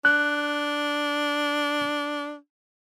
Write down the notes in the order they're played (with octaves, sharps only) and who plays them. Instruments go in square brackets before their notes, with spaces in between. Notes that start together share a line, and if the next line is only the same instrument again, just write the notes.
[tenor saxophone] D4 [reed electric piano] F#6